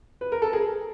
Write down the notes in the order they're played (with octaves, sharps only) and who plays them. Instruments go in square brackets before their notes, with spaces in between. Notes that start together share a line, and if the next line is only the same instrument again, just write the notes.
[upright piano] B4
A#4
A4
G#4 A#4